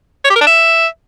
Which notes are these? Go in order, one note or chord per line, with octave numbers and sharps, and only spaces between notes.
C#5
G4
A#4
D4
E5